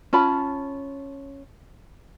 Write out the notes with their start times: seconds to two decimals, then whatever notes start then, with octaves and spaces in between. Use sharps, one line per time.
0.13 C#4 F4 A5 B5